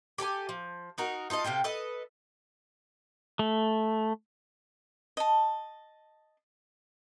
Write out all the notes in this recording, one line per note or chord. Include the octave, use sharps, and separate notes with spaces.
G4 A4 G5 G#5
F3
D#4 F#4 A#4
D#4 F4 A4 D#5
C3 F4 A4 G5
A4 B4 D#5
A3
D#5 A5